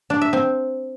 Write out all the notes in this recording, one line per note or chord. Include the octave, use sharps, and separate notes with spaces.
D4
E5
C4